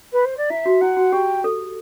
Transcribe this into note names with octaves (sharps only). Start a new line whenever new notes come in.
B4
C5
D5
E4 E5
F#4
E4 F#5
F#4
G4 G5
A4